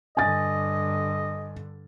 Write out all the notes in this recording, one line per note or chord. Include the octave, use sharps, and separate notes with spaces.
G2 D3 D#5 G#5 A6